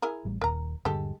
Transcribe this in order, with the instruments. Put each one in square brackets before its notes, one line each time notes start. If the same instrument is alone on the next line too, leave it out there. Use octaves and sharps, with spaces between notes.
[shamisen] E4 G#4 A#4
[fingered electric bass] A1 G3
[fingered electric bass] D#1 D#2 [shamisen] A#4 A#5
[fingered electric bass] D#1 G2 D3 [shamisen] G#3 G4 A4